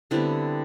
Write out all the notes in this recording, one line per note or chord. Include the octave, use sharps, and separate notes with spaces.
D3 G3 B3 C4 E4